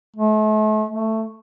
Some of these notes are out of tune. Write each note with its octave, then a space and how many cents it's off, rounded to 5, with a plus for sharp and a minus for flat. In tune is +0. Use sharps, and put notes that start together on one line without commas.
A3 -40
A3 +10